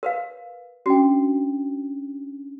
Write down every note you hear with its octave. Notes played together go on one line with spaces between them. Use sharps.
A#4 B4 F5
C#4 D4 F#4 G5